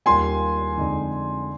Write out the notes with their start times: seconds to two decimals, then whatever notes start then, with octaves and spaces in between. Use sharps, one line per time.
0.06 D#2 D#3 G3 A#3 F4 G#5 C6
0.77 F2 D3 G#3 D#4